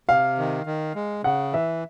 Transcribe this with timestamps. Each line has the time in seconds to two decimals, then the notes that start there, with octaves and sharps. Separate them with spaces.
0.09 C3 F5
0.38 D#3
0.66 D#3
0.95 G#3
1.24 C#3 F#5
1.53 E3 E5